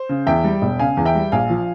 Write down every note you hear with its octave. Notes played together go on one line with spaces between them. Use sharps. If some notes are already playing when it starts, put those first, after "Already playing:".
Already playing: C5
C#3
E2 E5 G5
G3
E1
C#3 F5 G#5
E2
E5 G5
G3
A#1 F5 G#5
F3